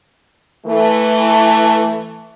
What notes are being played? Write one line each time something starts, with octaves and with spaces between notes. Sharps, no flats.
E3 A3